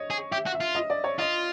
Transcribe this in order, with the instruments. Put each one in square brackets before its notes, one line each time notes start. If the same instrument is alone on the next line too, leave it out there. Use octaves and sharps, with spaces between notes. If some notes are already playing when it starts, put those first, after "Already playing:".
Already playing: [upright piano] C#5 D#5
[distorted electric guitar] G#4
[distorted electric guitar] G4 [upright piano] E5
[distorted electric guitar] F#4
[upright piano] E5
[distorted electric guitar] F4
[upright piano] D#5
D5
C#5
[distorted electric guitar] F4 [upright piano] D#5